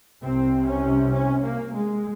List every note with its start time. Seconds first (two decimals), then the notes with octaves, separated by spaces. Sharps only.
0.21 C2 C3 C4
0.68 C#4
1.13 C#4
1.43 A#3
1.74 G#3